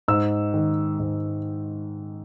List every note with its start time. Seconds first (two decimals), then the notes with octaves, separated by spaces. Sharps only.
0.08 G#2 E6
0.54 D#3
0.99 G#2